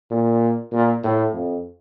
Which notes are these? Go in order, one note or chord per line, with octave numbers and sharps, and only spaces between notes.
A#2
A#2
A2
F2